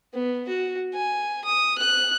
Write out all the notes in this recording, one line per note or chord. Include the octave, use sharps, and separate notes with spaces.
B3
F#4
G#5
D#6
F#6